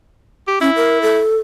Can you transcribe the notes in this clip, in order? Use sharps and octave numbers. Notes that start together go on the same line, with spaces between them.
G4
C#4 E4
A#4
A4